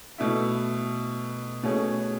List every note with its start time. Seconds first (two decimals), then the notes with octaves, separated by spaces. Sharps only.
0.18 B2 A3 E4
1.63 B2 A3 C#4 G#4